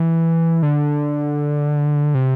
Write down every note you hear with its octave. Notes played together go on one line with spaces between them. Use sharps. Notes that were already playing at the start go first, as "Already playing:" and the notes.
Already playing: E3
D3
C3